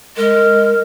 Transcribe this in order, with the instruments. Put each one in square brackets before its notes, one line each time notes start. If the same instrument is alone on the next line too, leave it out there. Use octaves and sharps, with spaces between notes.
[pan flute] G#3 [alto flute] A#4